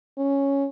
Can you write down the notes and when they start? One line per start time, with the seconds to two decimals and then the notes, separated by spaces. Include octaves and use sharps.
0.18 C#4